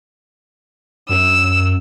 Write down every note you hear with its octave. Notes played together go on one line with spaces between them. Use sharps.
F#2 E6